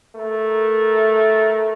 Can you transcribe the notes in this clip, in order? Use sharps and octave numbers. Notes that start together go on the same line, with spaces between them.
A3 A#4